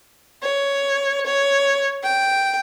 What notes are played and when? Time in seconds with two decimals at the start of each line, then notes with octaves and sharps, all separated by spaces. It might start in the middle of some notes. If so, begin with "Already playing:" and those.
0.43 C#5
1.26 C#5
2.03 G5